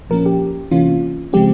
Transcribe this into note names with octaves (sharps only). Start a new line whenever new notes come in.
A#2 F3 A#3 C#4 A#4
G4
C3 E3 A#3 C#4 F4
C#3 F3 G#3 C4 G4